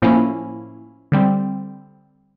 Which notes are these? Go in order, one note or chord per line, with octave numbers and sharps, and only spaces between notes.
A2 F3 A#3 C#4 E4
D3 G3 C4